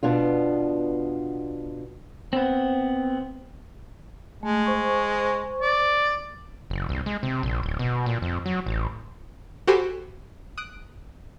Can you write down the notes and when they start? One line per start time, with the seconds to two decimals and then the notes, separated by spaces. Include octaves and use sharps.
0.03 B2 B3 D4 F4
2.33 B3 C4
4.43 G#3 A3
4.66 C5 C#6
5.62 D5
6.70 F#1
6.89 C2
7.06 G#3
7.23 C3
7.43 A#1
7.63 D1
7.79 B2
8.06 A#2
8.22 F2
8.46 F#3
8.66 A1
9.67 F#4 G4 A4 C5 G#5 B5
10.58 D#6 F#6 D7